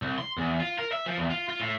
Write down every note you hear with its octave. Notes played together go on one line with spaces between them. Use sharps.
C2
C6
E2
F4
A#4
E5
F3
E2
F4
F4
A2